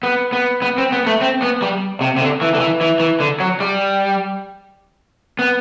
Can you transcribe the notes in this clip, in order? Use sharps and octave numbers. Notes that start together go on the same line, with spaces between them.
B3
B3
B3
C4
B3
A3
C4
B3
G3
C3
C3
D3
E3
D3
E3
E3
E3
D3
F#3
G3
B3